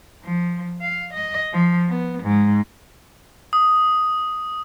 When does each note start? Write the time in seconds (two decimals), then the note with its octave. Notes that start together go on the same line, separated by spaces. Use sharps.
0.23 F3
0.81 F5
1.13 D#5
1.53 F3
1.89 B3
2.23 G#2
3.53 D#6